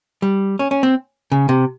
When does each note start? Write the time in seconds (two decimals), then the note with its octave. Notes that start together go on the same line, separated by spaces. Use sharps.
0.22 G3
0.59 C#4
0.71 C#4
0.83 C4
1.32 C#3
1.49 C3